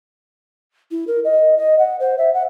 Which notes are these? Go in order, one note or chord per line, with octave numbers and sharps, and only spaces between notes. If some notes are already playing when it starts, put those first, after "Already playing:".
E4
A#4
D#5
D#5
F#5
C5
E5
F#5